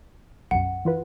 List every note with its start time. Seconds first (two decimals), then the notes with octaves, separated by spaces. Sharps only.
0.51 B1 F#2 F#5
0.85 E3 F4 B4